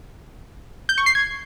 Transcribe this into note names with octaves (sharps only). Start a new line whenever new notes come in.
G6
C#6
C7
G#6